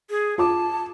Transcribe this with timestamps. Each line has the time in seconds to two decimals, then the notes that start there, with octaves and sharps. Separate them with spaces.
0.10 G#4
0.38 F4 A5 D6